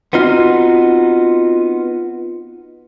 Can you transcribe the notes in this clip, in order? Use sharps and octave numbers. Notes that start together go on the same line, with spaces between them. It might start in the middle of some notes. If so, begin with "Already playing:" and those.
B3 C4 D#4 F4 F#4